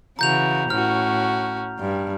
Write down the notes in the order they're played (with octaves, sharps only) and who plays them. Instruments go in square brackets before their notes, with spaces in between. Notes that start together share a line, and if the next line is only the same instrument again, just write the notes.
[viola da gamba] C#3 E3 F#4 [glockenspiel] A#5 G6 F7
[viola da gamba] A2 C#4 F#4 [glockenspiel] F6
[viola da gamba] G2